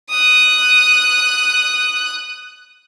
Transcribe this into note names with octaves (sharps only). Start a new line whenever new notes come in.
D#6 F#6